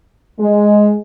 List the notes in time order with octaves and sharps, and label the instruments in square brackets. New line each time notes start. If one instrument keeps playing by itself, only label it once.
[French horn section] G#3